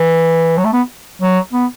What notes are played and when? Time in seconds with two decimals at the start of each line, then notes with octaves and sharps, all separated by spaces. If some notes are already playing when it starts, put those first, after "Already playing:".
Already playing: E3
0.58 F#3
0.65 A3
0.73 B3
1.22 F#3
1.53 B3